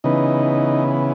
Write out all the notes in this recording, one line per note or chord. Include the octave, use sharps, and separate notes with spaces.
C#3 E3 B3 D#4